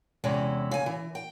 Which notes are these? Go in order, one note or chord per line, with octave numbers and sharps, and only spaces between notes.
E2 C3 G#3 C#4 E4
C#3 G#5
E3
G5